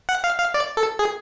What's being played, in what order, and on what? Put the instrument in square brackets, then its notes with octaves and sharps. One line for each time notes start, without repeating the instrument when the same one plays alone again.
[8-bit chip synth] F#5
F5
F5
D5
A4
G#4